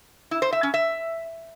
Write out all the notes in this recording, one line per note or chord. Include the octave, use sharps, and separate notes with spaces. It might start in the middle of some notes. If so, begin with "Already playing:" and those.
E4
C5
E5
C#4
E5